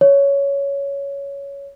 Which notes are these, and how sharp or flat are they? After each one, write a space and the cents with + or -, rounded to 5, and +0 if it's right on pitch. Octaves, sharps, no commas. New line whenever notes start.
C#5 +10